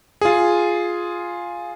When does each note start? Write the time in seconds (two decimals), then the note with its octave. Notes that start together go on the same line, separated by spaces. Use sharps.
0.21 F4 G#4